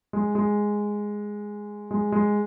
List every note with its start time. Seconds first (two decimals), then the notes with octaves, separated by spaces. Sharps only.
0.13 G#3
0.35 G#3
1.91 G#3
2.12 G#3